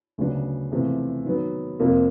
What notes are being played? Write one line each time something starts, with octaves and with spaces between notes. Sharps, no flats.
D2 C#3 F#3 B3 D4
E2 C3 F3 A3
D#3 F#3 B3
F2 C3 F3 A#3